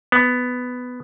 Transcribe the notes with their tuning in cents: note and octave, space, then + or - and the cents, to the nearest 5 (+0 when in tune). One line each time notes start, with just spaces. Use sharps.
B3 +10